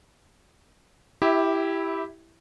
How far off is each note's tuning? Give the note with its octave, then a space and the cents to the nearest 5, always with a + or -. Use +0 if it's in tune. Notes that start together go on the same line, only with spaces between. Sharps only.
E4 +0 G4 +0 E5 -25